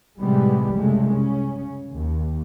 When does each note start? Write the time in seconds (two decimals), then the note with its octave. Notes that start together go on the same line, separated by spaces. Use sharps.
0.18 A2 C3 E3 G3 G#3 B3
0.71 C2 F#2 C#3 G#3 A3
1.10 C#3 C#4
1.93 D#2